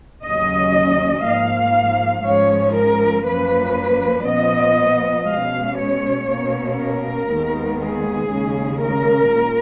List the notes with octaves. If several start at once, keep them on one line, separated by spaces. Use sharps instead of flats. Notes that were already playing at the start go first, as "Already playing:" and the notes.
D#2 C#3 F#3 C#4 D#5
G#2 F3 A#3 F5
G#2 F3 G#3 C#4 C#5
A#4
F#2 F3 A#3 C#4 B4
A#2 F3 B3 D#5
B2 G#3 C#4 F5
C#5
B2 A#3 C#4
A#4
D#2 D#3 G#3 B3
G#4
D#2 C#3 G#3 C#4
A#4
A#2